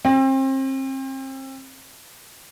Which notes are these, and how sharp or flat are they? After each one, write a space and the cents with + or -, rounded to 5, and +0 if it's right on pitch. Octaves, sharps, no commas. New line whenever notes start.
C4 +35